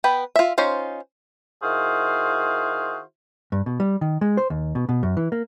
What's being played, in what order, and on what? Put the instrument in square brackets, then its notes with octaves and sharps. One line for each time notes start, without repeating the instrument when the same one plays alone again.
[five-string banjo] B3 B4 G5
F4 E5
C#4 D#4 F4 C5
[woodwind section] D#3 E4 F#4 G#4 C5 F5
[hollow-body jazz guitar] G2
B2
G3
D#3
G#3
C5
D#2
B2
B2
F#2
E3
A#3